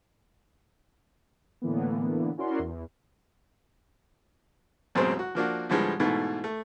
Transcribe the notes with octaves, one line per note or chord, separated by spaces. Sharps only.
A2 D3 E3 A#3 B3
C#4 E4 F#4 A#4 D5 C6
E2
A1 F#2 B2 G#3 C4 C5
F#4
F3 A#3 D4 F#4
A2 D3 F3 G3 G#3 B3
G#2 B2 E3 A3
A3